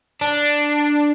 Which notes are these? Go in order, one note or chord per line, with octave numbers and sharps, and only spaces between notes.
D4